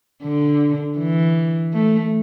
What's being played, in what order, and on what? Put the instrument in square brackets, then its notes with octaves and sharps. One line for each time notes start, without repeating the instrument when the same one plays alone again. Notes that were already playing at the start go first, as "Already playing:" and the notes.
[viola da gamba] D3
E3
A3